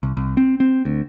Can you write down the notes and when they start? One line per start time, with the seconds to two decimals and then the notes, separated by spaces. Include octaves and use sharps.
0.03 C2
0.17 C2
0.37 C4
0.60 C4
0.85 D2